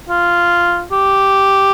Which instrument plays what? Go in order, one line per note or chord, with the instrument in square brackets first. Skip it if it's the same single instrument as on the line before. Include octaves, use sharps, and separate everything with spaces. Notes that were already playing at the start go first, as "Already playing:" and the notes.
[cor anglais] F4
G4